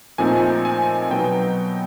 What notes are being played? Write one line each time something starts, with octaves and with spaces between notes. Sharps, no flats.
A#2 F3 A3 C4 D#4 G#5
G#5
G#5
B2 F#3 B3 D#4 G5